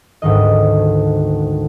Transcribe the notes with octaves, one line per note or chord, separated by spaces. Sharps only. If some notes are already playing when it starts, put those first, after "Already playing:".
G#1 D2 G#2 D#3 D#5